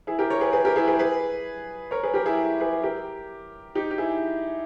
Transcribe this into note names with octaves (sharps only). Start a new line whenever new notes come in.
E4 G#4
G4 A#4
A#4 C#5
G#4 B4
G#4 B4
G4 A#4
E4 G#4
G#4 B4
G#4 B4
A#4 C#5
G#4 B4
G4 A#4
E4 G#4
G#4 B4
G4 A#4
D#4 G4
G4
E4 G#4